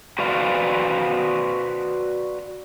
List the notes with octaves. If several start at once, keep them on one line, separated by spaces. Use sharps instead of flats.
F#4 B4 C5 D5 F5